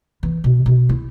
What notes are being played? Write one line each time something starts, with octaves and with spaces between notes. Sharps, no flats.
E3
B2
B2
E4